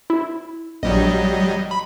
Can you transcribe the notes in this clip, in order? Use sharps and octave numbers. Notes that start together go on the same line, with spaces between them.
E4
A#1 F#3 G3 D#5
B5